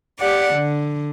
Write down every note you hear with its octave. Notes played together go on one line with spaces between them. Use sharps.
G4 D5 F#5
D3